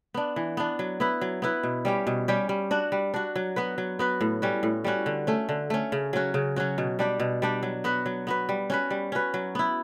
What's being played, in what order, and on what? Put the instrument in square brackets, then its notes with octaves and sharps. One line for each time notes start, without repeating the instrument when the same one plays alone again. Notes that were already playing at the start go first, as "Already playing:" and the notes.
[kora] B3 D4
E3
B3 D4
F#3
B3 E4 B4
F#3
B3 E4 B4
B2
G3 C#4 G4
B2
G3 C#4 G4
G3
D4 F#4
G3
D4 F#4
F#3
B3 F#4 B4
F#3
B3 F#4 B4
A2
G3 C#4 F#4
A2
G3 C#4 F#4
D3
A3 C#4
D3
A3 C#4
C#3
F#3 C#4 F#4
C#3
F#3 C#4 F#4
B2
G3 D4 G4
B2
G3 D4 G4
F#3
B3 F#4 B4
F#3
B3 F#4 B4
G3
C#4 F#4 B4
G3
C#4 F#4 B4
F#3
B3 E4